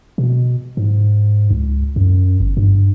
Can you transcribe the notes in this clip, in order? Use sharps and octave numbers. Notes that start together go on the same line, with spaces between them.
B2
G#2
C#2
F#2
G1
G2